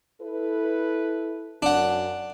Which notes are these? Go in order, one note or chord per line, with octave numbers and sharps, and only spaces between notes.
E4 A4 B4
F#2 D4 F#5